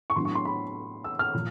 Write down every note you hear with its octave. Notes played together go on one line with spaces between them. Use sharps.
C#6
A2 F#3 B3 D4 C6
C#6
C6
B5
E6
F6
A#2 F3